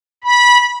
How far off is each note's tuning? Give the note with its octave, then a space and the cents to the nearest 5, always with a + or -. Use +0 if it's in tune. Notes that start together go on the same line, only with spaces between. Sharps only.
B5 -20